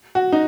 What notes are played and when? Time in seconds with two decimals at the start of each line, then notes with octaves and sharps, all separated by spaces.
0.15 F#4
0.32 D#4